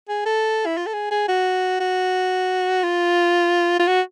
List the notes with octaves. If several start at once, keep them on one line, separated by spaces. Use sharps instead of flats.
G#4
A4
E4
F4
A4
G#4
G#4
F#4
F#4
F4
F4
F#4